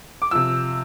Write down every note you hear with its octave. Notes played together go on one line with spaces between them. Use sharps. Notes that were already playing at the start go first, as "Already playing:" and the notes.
D6
C3 F3 E6